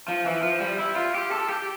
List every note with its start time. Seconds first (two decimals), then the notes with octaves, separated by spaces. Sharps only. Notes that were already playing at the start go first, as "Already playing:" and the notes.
0.08 F3
0.26 E3
0.43 F3
0.60 G3
0.78 E4
0.96 F4
1.15 G4
1.31 A4
1.49 G4